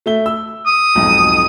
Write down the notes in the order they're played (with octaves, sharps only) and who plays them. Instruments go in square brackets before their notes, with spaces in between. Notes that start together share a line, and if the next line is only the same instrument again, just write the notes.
[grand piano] A3 E5 G7
E6
[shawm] D#6
[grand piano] B1 F2 G#2